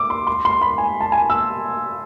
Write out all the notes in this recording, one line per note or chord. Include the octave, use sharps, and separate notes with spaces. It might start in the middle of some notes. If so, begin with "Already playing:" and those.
Already playing: D6 E6
C6
C6
C6
B5
G#5
A5
G#5
E6